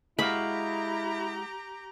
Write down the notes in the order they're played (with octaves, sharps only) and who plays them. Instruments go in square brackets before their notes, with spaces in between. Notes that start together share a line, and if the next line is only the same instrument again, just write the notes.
[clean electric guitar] G#3 F#4 F5 [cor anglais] E4 [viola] G4 A#5 [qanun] B5